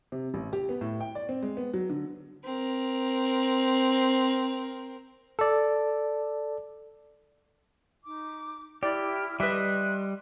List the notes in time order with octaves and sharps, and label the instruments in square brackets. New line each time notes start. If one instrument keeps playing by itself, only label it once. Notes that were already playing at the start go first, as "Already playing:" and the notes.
[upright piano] C3
A1
G4
B3
A2
G5
D5
C4
G#3
B3
F#3
D3
[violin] C4 A#4
[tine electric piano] A4 D5
[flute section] D#4 D6
[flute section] E4 F6 [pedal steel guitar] G4 [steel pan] D5
[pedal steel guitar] G3 G4 D#5 [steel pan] B4 E5 [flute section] C6 [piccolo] F#6